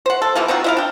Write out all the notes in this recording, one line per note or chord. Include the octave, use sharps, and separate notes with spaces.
C5 F#5
A4
C3 E3 F3 A#3
C4 D#4 F4 F#4
E4 D#5 F5
D4 G5